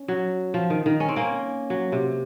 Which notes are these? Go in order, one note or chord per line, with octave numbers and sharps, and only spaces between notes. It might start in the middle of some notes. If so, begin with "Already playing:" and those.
Already playing: C#4
F#3
F3
D#3
D#3
C#4
C4
A#3 C#4
F#3
C3